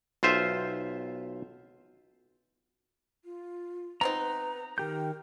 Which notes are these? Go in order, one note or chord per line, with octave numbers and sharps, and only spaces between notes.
B1 F4 C5 E5
F4
B3 C4 D#4 B4 A#5
D#3 G4 A#4 G6